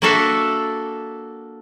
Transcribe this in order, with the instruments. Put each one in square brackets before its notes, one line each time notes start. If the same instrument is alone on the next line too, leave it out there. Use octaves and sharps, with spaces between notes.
[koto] A#3 D4 F#4 A4 E5 F5